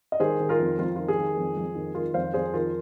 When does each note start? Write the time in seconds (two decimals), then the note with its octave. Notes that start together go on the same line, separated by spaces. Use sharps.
0.12 D#5
0.20 D#3 G#4 C5
0.40 D#3
0.49 F4 A#4
0.59 F2
0.78 F2 F4
0.96 D#3 F4
1.08 G#4
1.18 D#3
1.37 F2
1.57 F2
1.75 D#3
1.95 D#3 F4 A#4
2.14 F2 C5 F5
2.34 F2 G#4 C5
2.54 D#3 F4 A#4